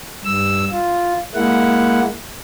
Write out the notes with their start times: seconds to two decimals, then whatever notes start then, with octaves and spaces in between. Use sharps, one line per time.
0.25 G2 E6
0.71 F4
1.34 G#3 A#3 E4 F#5